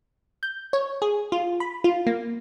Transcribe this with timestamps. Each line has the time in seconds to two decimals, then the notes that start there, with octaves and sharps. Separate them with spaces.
0.43 G6
0.73 C#5
1.02 G#4
1.32 F4
1.60 B5
1.84 F4
2.07 A#3